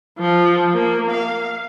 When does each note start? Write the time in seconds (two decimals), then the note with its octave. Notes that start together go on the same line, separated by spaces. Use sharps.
0.19 F3
0.74 A#3
1.11 F5